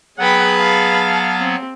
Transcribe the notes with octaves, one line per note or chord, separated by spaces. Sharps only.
F#3 B3 G#4 B4 F#5 G5 B5
F5 A5
C4